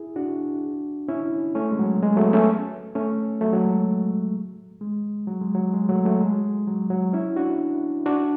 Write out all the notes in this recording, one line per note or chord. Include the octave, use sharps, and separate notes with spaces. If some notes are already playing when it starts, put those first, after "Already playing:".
Already playing: E4 G#4
D4 F#4
C#4 E4
A3 C#4
G#3
F#3
G#3
F#3 A3
B3
A3 C#4
A3 C#4
F#3 A3
F#3
G#3
G#3
F#3
G#3
F#3
G#3
F#3 A3
F#3 A3
G#3
F#3
F#3
C#4 E4
D4 F#4
D4 F#4